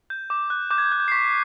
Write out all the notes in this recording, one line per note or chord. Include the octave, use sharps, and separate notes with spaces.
G6
D6
F#6
D6 G6
G#6
G6
F#6 G#6
G6
C7
C#6 B6